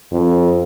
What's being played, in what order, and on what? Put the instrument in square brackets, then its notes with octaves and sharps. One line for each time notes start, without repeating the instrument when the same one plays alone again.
[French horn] F2